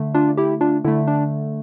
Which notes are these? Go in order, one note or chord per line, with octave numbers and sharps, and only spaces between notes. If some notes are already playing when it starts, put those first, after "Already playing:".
Already playing: D3 A3
D4 F4
E4 G4
D4 F4
D3 A3 E4
D4